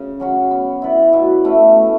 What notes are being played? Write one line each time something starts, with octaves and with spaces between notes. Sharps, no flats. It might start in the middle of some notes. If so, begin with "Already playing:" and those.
Already playing: C#3
F#3 C#4 F#4
B3
E4 B4 D5
B2
A3 C#4 E4
A3